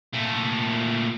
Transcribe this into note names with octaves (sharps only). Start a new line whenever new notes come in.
A#2 A3